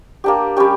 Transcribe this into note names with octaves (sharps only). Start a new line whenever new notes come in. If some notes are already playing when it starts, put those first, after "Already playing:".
A#3 D4 G4
G3 C#4 G4